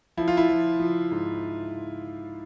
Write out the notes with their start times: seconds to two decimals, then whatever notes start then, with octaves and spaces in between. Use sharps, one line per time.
0.17 F3 E4
0.28 F4
0.37 E4
0.49 F3
0.80 F3
1.11 G#2